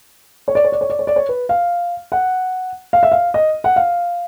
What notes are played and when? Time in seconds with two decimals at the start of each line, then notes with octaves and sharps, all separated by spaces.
0.48 C#5
0.55 D5
0.64 C#5
0.72 D5
0.81 C#5
0.90 D5
0.99 C#5
1.07 D5
1.16 C#5
1.29 B4
1.49 F5
2.12 F#5
2.93 F5
3.03 E5
3.12 F5
3.34 D#5
3.64 F#5
3.76 F5